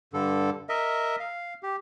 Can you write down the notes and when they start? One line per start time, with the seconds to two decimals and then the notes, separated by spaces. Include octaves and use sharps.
0.13 G2 D3 A4
0.69 A#4 D#5 E5
1.20 F5
1.63 G4